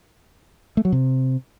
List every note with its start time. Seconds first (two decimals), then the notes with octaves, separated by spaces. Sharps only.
0.77 A3
0.85 F#3
0.92 C3